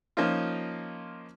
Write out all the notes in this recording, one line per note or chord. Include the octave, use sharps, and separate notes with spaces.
F3 A#3 C#4 D#4 F4